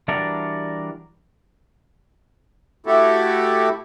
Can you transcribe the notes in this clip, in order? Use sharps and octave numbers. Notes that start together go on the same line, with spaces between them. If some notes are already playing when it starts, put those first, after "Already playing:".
E3 G3 D4 F#4 A#4 D5
A3 E4 F#4 G4 A4